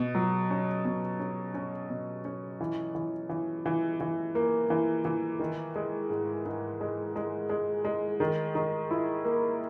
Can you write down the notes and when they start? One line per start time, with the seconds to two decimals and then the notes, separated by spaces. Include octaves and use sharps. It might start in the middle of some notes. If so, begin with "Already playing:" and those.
Already playing: B2
0.15 F#3
0.50 C#4
0.85 B2
1.20 C#4
1.54 C#4
1.90 B2
2.25 C#4
2.61 E3
2.95 E3
3.29 E3
3.66 E3
4.00 E3
4.35 A#3
4.70 E3
5.05 E3
5.39 D#3
5.76 G#3
6.10 G#2
6.46 G#2
6.81 G#3
7.16 G#3
7.49 G#3
7.85 G#3
8.20 D#3
8.55 D#3
8.91 E4
9.25 A#3